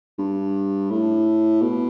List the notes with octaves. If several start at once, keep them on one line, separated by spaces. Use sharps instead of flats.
G2
A2
B2